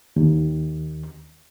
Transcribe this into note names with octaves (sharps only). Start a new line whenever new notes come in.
D#2